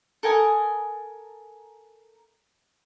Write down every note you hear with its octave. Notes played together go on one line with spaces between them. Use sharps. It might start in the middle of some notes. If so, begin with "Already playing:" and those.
A4 A#4 G#5 D#6